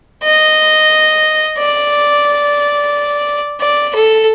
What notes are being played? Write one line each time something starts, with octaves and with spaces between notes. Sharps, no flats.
D#5
D5
D5
A4